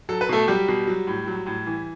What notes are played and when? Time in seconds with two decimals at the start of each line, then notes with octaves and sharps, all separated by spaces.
0.09 F#3 A4
0.21 B4
0.29 B2 A3 A4
0.48 F#3 G3 G4
0.68 B2
0.87 F#3
1.07 A2
1.27 F#3
1.46 A2
1.66 E3